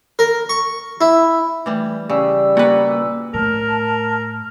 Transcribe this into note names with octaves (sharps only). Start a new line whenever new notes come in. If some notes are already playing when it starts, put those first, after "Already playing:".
A#4
C#6
E4
E3 G3 A3
C#3 G3 E6
A#2 F#4 B4
A2 A#4 A5 F6